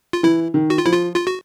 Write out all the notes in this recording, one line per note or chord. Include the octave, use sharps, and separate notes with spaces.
F4
E3 E4
D#3
F#4
F4
F3 E4
F4
F4
F#4